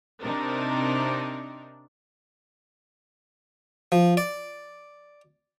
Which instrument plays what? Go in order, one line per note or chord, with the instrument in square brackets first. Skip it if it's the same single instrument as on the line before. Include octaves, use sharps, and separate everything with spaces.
[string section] C3 C4 D4 D#4 A#4
[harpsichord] F3
D5